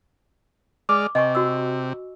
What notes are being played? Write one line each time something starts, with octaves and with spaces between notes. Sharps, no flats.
G#3 D5 D6 F6
C3 D#5 G#5 C#6
F#4 E6